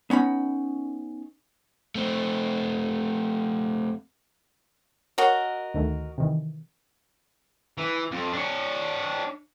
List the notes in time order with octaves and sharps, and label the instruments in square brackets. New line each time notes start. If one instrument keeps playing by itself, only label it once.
[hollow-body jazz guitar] B3 C#4 D#4 B5
[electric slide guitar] A3 C4
[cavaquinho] F#4 A#4 D#5 [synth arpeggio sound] C#5
[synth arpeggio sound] D2 D#3 A3
C3 D#3 E3
[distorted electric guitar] E3
F2
D4 C#5